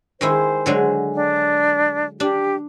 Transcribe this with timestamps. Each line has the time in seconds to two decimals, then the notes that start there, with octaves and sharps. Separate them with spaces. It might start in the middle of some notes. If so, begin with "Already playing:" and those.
0.21 D#3 G#3 E4 C5
0.66 D3 F#3 G#3
1.15 D4
2.20 D4 G4